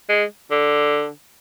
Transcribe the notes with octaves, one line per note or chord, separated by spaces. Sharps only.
G#3
D3